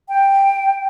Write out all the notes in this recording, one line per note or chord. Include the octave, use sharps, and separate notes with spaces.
G5